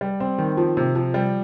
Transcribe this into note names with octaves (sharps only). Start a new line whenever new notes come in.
G3
C4
D#3
F3
C3
F3
G3